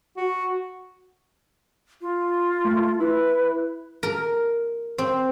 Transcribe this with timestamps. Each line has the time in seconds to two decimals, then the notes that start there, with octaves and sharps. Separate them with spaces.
0.17 F#4
2.01 F4
2.65 A3
3.00 E4 B4
4.03 A#4
4.98 C4